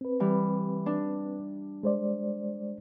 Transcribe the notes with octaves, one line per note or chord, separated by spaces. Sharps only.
C4 B4
E3 G3
D4
G#3 C5 D5